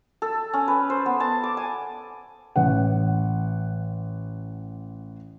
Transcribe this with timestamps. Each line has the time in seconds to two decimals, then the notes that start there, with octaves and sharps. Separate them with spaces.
0.22 A4
0.54 C#4
0.68 B4
0.90 C5
1.06 B3
1.20 A5
1.44 D6
1.57 G#5
2.56 A1 F#5